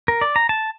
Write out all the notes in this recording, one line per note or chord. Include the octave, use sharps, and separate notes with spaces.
A#4
D5
A#5
A5